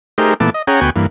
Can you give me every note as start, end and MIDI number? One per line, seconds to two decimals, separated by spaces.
0.18 0.34 57
0.18 0.34 63
0.18 0.34 67
0.18 0.34 68
0.18 0.34 70
0.18 0.34 72
0.40 0.50 46
0.40 0.50 52
0.40 0.50 57
0.40 0.50 59
0.40 0.50 81
0.40 0.50 86
0.54 0.62 75
0.67 0.80 61
0.67 0.80 68
0.67 0.80 73
0.67 0.80 78
0.67 0.80 79
0.67 0.80 82
0.81 0.90 38
0.81 0.90 59
0.81 0.90 66
0.81 0.90 79
0.81 0.90 80
0.81 0.90 85
0.96 1.06 43
0.96 1.06 52
0.96 1.06 58